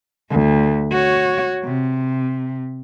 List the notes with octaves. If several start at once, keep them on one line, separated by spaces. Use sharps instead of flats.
D2
F#4 C#5
C3